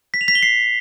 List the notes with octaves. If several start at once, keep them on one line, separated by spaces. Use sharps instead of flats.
B6
F7
B6
G7
C7